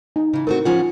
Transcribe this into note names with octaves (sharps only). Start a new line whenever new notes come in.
D#4
C#3 E3
A3 C4 F#4 A#4
F3 C#4 F4 F#5